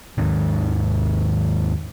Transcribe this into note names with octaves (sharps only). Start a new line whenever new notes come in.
D#2 G#2 D#3